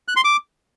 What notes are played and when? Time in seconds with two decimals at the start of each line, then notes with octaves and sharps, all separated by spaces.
0.08 F#6
0.16 C6
0.24 D6